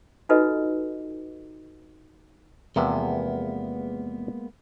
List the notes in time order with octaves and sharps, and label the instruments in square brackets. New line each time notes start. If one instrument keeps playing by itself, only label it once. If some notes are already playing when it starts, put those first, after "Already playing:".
[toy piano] D#4 F4 F#4 A4 B4 D#5
[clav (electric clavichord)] E2 C3 F3 [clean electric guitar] G#3 A#3 B3